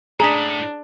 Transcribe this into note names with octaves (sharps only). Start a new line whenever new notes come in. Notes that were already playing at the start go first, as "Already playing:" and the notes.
A2 D4 G#4 A#5 B6